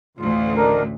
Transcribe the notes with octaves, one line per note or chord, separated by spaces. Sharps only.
A1 D2 F4
D#3 D4 A#4